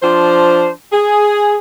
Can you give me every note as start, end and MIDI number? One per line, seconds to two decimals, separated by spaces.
0.02 0.69 53
0.02 0.69 62
0.02 0.69 72
0.93 1.57 68